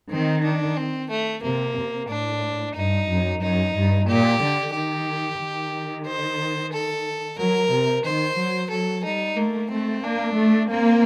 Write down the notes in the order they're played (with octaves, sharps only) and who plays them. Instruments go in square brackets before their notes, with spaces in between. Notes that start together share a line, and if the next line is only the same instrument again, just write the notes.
[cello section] D#3 [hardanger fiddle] C4
[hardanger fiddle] D4
C4
A3
[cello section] C3 [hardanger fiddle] A#3
[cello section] C3
[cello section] A2 [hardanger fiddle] D4
[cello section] G2 [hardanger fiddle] D#4
[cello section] F#2
[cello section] F#2 [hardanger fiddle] D#4
[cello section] G2
[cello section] A#2 [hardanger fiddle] G4
[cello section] D3
[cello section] D#3 [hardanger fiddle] G4
[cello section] D#3
[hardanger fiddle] C5
A4
[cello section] F#3 [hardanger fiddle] A#4
[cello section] C3
[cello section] D#3 [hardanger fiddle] C5
[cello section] F#3
[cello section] F#3 [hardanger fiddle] A4
[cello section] G3 [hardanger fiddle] D#4
[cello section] A3 [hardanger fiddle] A#3
[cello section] A3 [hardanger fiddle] C4
[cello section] A#3 [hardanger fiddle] D4
[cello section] A3
[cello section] A#3 [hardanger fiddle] C4